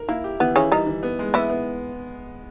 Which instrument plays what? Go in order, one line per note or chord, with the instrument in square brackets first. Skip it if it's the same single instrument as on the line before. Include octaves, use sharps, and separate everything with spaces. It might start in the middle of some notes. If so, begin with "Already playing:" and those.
Already playing: [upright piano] A#4
[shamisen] A#3 [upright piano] E4
[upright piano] G4
[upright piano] E3 [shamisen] B3
[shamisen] C#3 C#4 [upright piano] E3
[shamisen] D#3 D#4 [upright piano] G3
[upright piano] E3
B3
G#3
[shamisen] E3 E4 [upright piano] B3
[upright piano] B3